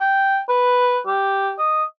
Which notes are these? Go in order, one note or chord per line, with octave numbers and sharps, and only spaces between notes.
G5
B4
G4
D#5